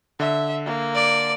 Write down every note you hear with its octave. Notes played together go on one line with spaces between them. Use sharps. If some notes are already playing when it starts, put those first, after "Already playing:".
D3 E5
A#3
D5